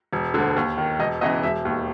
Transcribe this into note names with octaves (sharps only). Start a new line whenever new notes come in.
E1
D2 D3
D#2
D#3
E1 D#5
E2 C#3 E3 D#5
E1 E5
D#2 D#3